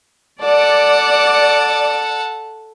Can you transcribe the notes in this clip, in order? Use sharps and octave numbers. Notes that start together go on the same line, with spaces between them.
A4 D5 F#5